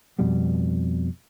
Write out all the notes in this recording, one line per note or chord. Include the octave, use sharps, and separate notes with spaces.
F2 B2 G3 B3